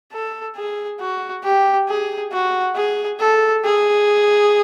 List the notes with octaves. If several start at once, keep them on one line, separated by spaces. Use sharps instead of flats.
A4
G#4
F#4
G4
G#4
F#4
G#4
A4
G#4